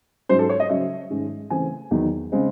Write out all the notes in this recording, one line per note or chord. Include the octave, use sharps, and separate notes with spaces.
G#2 F#3 C#4 C5
A4
C#5
D#5
C#3 F#3 C#4 E5
G#2 D#3 G#3 C#4
C#3 E3 A3 C4 G#5
E2 D#3 F#3
C#3 G#3 C4